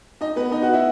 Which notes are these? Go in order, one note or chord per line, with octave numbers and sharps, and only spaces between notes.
D#4 D#5
B3 B4
D#4 D#5
F#4 F#5
E4 E5